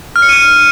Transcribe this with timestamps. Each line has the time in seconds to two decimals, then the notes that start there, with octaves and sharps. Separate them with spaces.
0.16 F6
0.22 C#7
0.29 D#7